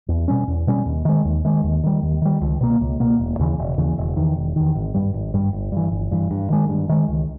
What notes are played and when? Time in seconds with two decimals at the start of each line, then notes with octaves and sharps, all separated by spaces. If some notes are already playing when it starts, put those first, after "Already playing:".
0.08 E2
0.28 B2 G3 C#4
0.48 E2
0.67 B2 G3 C#4
0.86 D#2
1.05 D#3 G#3
1.25 D#2
1.45 D#3 G#3
1.64 D#2
1.83 D#3 G3
2.02 D#2
2.22 D#3 G3
2.41 C#2
2.61 B2 A#3
2.81 C#2
3.00 B2 A#3
3.19 E1
3.39 D#2 C#3 E3
3.59 E1
3.78 D#2 C#3 E3
3.98 E1
4.16 E2 D#3
4.36 E1
4.56 E2 D#3
4.75 G#1
4.94 G2 G3
5.14 G#1
5.34 G2 G3
5.53 G1
5.72 G2 E3
5.91 G1
6.11 G2 E3
6.31 G2
6.50 D#3 G#3
6.69 G2
6.89 D#3 G#3
7.08 C#2